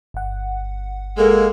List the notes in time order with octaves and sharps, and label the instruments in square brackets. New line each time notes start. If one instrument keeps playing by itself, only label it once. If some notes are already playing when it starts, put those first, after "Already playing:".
[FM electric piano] G1 F#5
[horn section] G#3 A#3 [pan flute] A4